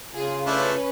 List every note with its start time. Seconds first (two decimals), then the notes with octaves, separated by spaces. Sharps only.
0.13 C#3 F4 G#4
0.46 A3 C#4 D4 E4 B4